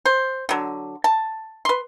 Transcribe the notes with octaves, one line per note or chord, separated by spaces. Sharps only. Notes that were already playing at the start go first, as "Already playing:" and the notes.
C5
D3 F#3
A5
B4 C6